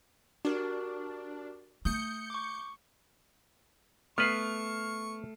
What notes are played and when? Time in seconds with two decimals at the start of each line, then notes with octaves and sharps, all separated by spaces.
0.45 D4 F#4 G4 A#4
1.85 A3 D#6 G6 C#7
2.30 C#6 D6
4.18 A3 B3 B4 C#6 F6 C7